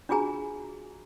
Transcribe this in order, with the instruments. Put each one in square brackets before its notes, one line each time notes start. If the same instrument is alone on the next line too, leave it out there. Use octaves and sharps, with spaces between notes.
[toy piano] D4 F4 F#4 G#4 G#5 A#5